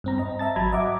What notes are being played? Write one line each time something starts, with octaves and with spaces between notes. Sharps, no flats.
G2 C4 A#5
D#5 A#5
E5 A5 A6
G#1 F#3 A#5 B5 G#6
D#5 E5 F#5 D6